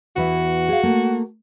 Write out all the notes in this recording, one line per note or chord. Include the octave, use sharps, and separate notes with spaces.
E2 E3 F#4 E5
G#4 F5
A3 A#3